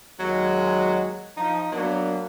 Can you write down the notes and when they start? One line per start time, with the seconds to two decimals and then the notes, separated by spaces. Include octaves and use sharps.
0.20 D#2 F#3 G#3
1.37 F3 D#4
1.72 F#3 A#3 B3 D4